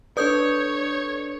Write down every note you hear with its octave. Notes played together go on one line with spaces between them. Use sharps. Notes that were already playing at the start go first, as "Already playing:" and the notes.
D4 A4 B4 C#5 D5 D#6 G6